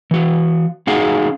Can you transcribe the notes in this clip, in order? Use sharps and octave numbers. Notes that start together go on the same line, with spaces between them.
E3 F#4
C#4 D#4 F#4 G#4 F5